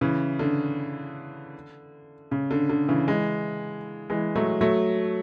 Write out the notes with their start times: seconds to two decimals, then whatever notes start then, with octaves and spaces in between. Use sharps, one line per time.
0.01 C#3 E3
0.39 D3
2.31 C#3
2.51 D3
2.69 D3
2.88 C#3 E3
3.08 E3 G#3
4.10 E3 G#3
4.35 F#3 A3
4.61 F#3 A3